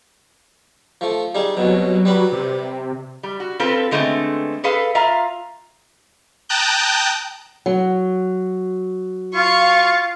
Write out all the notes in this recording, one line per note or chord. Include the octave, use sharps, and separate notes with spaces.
F3 A3
G3 D#4 G#4
C2 B2 F#3
G3 B4 B5
C3
G3
F#4
C4 F4 A4 B4
D3 G#3 A3 B3 C4
G#4 A4 B4 F5
F4 E5 F5 A#5
G5 A5 A#5 D#6 F#6 G6
F#3
F4 F5 C#6